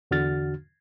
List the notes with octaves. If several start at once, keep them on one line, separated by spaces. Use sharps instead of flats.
E2 D3 D4 F#4 F6 A6